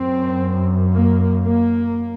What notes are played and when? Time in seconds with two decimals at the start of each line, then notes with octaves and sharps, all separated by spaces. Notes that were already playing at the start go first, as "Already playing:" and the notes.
Already playing: F#2 C4
0.92 A#3
1.43 A#3